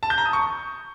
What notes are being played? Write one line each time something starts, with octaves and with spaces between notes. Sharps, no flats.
A5
G6
A#5
D#6
C#6